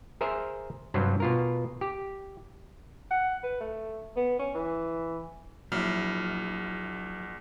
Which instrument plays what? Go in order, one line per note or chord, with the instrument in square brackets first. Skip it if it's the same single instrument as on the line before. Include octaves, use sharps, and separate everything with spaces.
[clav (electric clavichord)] G#4 A#4 C5 E5
G2 C3 F#3 C4
B2 F4 A#4
G4
[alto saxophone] F#5
B4
A3
B3
C#4
E3
[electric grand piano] A#1 F6 [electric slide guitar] F#3 E4